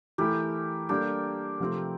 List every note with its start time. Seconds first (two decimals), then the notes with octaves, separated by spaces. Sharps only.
0.18 E3 A3 E4 G4 A#4
0.89 G3 A#3 D4 G4 A4 A#4
1.60 C3 F3 A3 C4